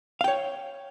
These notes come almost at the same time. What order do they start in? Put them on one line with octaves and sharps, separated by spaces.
F5 G5 C#5